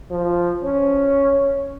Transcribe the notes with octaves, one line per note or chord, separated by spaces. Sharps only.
F3
C#4